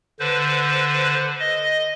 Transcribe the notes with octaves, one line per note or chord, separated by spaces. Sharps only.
D3 B4 C5
D#5